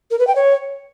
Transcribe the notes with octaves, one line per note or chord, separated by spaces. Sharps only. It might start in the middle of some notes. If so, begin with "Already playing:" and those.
A#4
B4
G5
C#5